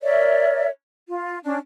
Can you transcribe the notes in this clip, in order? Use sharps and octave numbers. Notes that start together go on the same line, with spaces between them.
A#4 C#5 D5 E5
F4
C#4 D4